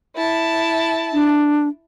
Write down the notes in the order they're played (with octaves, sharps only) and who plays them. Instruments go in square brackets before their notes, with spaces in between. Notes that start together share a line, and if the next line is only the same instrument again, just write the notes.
[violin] E4 A5
[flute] D4